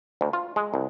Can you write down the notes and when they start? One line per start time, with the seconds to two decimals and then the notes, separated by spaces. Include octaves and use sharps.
0.21 D2
0.33 F4
0.56 G#3
0.74 C2